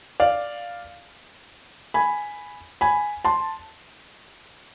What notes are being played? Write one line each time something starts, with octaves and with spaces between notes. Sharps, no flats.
D5 F5
G#5 B5
G#5 B5
A5 C6